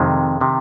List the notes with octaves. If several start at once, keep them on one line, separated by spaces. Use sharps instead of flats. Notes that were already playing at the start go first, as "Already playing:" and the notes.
Already playing: F2 C3 D#3 G#3
C3 D#3